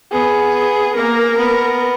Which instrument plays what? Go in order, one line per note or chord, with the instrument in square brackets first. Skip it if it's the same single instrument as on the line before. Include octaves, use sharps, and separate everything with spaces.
[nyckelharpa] B3 [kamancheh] G#4
[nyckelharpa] A#3 [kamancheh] A#4
[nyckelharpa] B3